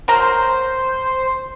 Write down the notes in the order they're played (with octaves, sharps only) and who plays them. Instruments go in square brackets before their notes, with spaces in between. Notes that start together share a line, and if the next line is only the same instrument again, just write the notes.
[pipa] F#3 A#4 A#5 [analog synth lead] C5